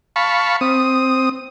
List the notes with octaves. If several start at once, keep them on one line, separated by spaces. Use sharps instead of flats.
F5 A5 B5 C#6
C4 D#6